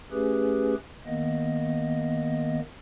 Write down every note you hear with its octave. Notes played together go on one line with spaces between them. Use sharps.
A3 C#4 G4 G#4 B4
D#3 A#3 B3 D#5